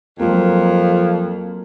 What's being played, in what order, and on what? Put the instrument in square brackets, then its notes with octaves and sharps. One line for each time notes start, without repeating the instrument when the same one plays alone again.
[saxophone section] F2 F3 [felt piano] F#3 A#3